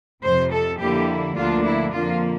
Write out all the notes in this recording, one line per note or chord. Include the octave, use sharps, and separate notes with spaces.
F2 C3 F3 C5
A4
F2 D3 G3 A#3 E4 G4
D2 D3 F3 A#3 D4 F4
E4
F2 D3 F3 A#3 F4